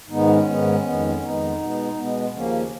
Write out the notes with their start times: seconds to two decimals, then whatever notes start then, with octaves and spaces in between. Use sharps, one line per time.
0.08 G#2 D#3 G#3 B3 D#4
0.27 C#4
0.45 G#2 D#3 G#3 B3
0.83 F2 D#3 G#3 B3
1.21 F2 D#3 G#3 B3 D#4
1.59 B2 G#3 B3
1.96 B2 G#3 B3
2.33 D#2 C#3 F3 A#3 C#4